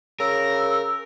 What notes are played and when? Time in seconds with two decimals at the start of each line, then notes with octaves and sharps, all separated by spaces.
0.20 C#3 A#4 E6